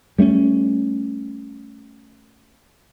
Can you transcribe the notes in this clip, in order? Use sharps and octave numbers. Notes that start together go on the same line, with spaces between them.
G3 A3 C4 C#4